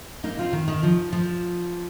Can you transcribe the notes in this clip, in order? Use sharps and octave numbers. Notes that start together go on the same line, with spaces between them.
A#3 D#4
C4 F4
D#3
D#3
F3
F3